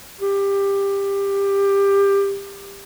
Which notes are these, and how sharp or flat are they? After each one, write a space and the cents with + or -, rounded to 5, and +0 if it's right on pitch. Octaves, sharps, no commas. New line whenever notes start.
G4 +20